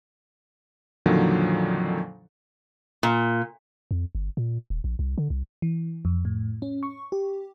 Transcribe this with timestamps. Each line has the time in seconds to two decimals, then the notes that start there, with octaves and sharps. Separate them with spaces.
1.06 F2 A#2 D3 D#3 F3 F#3
3.03 A#2
3.91 F2
4.15 G1
4.37 A#2
4.70 D#1
4.84 A#1
4.99 C2
5.18 D3
5.30 C2
5.62 E3
6.05 F2
6.25 A2
6.62 C#4
6.83 C#6
7.12 G4